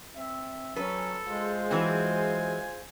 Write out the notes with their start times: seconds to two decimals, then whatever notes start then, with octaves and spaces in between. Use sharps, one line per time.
0.15 C4 E5
0.76 F#3 C#4 A4 B4
1.27 G#3 F4 G#4 C5
1.71 E3 F#3 C4 G#5